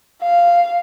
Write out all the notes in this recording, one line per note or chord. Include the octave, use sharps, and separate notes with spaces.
F5